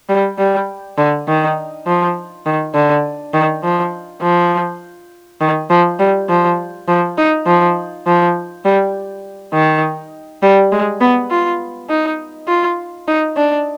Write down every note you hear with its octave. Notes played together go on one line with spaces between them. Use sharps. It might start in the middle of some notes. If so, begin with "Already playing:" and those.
G3
G3
D3
D#3
F3
D#3
D3
D#3
F3
F3
D#3
F3
G3
F3
F3
D#4
F3
F3
G3
D#3
G3
G#3
B3
F4
D#4
F4
D#4
D4